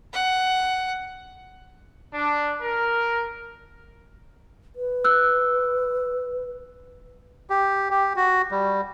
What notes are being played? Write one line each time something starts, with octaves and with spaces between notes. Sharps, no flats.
F#5
D4
A#4
B4
E6 F#6
G4
G4
F#4
G3